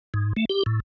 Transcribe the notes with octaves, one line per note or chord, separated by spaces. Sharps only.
G#2
A3
G4
A2